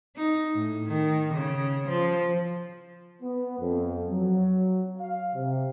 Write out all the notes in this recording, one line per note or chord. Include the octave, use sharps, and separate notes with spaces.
D#4
A2
D#3
C#3
F3
B3
F2
F#3
F5
C3